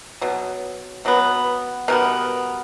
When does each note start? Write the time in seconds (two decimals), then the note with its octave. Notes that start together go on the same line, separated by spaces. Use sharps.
0.21 B2 F#3
1.05 B2 F#3 B3
1.88 B2 G3 B3 A#4